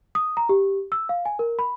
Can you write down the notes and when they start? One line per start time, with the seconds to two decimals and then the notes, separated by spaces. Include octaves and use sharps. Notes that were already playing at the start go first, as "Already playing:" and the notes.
0.15 D#6
0.37 A#5
0.49 G4
0.92 E6
1.09 F5
1.25 G#5
1.39 A#4
1.59 B5